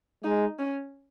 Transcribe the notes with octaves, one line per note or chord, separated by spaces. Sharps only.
G#3 D#4
C#4